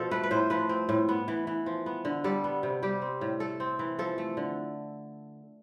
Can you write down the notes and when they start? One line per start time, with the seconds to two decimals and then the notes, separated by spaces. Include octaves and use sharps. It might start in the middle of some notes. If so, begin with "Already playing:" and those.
Already playing: B2 F3 F4 A4
0.11 A3 B4
0.23 B4
0.31 A2 C5
0.50 F3 B4
0.69 C4
0.89 A2
1.09 B3
1.28 E3
1.47 E3
1.66 F3
1.86 B3
2.05 D3
2.24 G3 A4
2.44 B3
2.63 C3
2.83 G3 G4
3.02 C4
3.21 A2
3.40 A3 A4
3.60 C4
3.79 E3
3.99 F3 A4
4.18 A3
4.37 D3